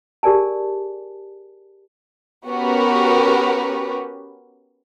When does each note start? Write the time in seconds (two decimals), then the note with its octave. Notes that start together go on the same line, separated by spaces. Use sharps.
0.23 G4 G#4 A#4 D5 G#5 A5
2.46 B3 C#4 F#4 G4 A#4 B4